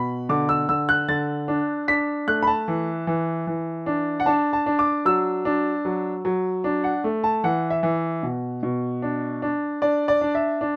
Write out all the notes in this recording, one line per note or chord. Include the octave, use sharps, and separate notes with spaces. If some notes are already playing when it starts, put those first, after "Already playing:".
Already playing: B2 B5
D3 D6
E6
D3 E6
F#6
D3 A6
D4
D4 B6
A3 F#6
B5
A5
E3
E3
E3
D4
F#5
D4 A5
A5
D4
D6
F#3 E6
D4
F#3
F#3
D4
F#5
A3
A5
E3 F#5
E5
E3
B2
B2
D4
D4
D4 D5
D5
D4
E5
D4